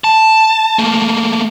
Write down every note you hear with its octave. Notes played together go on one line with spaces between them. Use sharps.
A5
A3 A#3